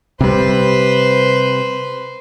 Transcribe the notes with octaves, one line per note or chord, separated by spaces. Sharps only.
C3 G3 B4 C5